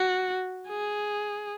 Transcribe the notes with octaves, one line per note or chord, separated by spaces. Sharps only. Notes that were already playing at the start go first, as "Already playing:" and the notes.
Already playing: F#4
G#4